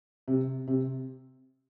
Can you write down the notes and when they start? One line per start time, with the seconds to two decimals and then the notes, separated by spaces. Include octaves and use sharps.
0.28 C3
0.67 C3